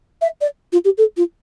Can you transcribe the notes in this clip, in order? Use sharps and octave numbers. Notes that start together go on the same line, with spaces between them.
E5
D5
F4
G4
A4
F4